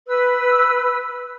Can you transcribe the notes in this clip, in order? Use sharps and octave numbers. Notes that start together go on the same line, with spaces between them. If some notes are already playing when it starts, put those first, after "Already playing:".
B4 E6